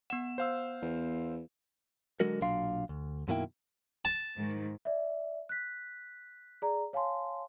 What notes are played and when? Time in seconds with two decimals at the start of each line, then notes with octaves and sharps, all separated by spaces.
0.10 B3 F#5 E7
0.38 C5 F5 E6
0.82 E2
2.20 D3 F#3 G#3 F#4 A#4
2.42 B1 A#2 F#3 D4 F5 C6
2.89 D2
3.28 F#2 B2 D#3 A#3 E4 G5
4.05 A5
4.37 G#2 D#3
4.85 D5 E5
5.49 F#6 B6
6.62 G#4 D5 A#5
6.93 C#5 F5 G#5 A5 C6